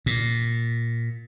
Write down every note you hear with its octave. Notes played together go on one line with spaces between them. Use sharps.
A#2